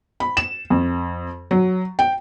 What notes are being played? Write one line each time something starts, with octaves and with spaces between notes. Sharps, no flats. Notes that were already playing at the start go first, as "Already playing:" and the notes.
B5
E7
F2
F#3
G5